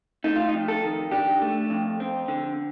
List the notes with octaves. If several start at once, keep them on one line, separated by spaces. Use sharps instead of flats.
A3 D#4
F4
D#4
F2
A4
D#3
D4 G4
A3
F2
C4
D3